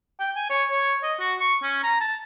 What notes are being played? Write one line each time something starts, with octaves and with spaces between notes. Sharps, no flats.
G5
G#5
C#5
C#5
D#5
F#4
C#6
C#4
A#5
A5